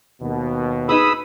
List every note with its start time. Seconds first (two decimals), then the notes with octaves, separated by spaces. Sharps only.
0.22 D#2 B2
0.89 D#4 G#4 B4 B5 D#6 E6